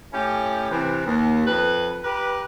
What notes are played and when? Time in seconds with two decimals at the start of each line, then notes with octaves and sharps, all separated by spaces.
0.13 A2 C#4 E4 G4
0.70 C3 E3
1.06 D#2
1.47 F2 B4
2.03 G4 A#4 B4